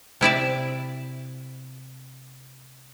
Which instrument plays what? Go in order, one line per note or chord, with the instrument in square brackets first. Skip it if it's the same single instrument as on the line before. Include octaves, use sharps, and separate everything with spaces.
[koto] C3 E4 D5 E5